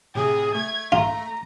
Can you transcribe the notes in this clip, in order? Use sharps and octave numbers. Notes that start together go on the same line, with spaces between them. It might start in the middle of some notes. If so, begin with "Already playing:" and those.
A2 C3 G#4
A3 G#6
F4 A#5